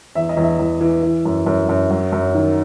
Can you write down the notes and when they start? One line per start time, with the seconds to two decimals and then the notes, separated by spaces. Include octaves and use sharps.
0.15 E2 E5
0.29 D#5
0.37 E2
0.43 E5
0.59 E2
0.81 E3
1.03 E3
1.25 F#2
1.46 F#2
1.69 F#2
1.90 F#3
2.12 F#2
2.35 D#3